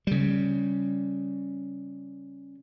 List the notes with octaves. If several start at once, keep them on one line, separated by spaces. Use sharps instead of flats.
C#3 G3